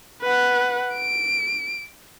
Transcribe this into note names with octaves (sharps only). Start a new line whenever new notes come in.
B4 F#5
D7